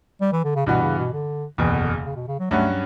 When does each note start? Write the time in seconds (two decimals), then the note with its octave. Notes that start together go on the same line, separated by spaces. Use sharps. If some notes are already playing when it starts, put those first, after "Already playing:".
0.21 G3
0.32 E3
0.44 D3
0.56 C#3
0.66 G2 B2 E3 B3 F#4
0.82 C#3
0.98 B2
1.13 D3
1.58 F#1 E2 B2 E3
1.71 D3
1.82 D3
1.93 C#3
2.05 C#3
2.16 B2
2.28 C#3
2.39 F#3
2.51 G2 F#3 A3 C#4 F#4